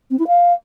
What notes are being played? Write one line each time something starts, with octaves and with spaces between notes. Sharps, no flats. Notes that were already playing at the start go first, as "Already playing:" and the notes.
C4
E4
F5